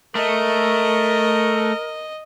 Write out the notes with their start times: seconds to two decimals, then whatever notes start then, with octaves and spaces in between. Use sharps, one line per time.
0.15 A3 A#4 D#5